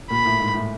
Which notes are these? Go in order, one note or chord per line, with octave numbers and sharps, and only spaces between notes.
A#2 B5
A2
G#2
A2